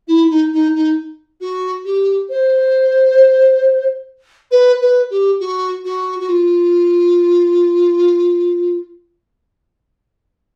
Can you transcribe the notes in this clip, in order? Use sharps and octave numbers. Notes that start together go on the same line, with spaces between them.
E4
D#4
D#4
D#4
F#4
G4
C5
B4
B4
G4
F#4
F#4
F#4
F4